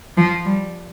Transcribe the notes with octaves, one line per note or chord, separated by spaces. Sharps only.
F3
G3